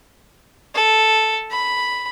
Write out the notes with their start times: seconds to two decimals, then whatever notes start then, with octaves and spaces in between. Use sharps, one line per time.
0.74 A4
1.50 B5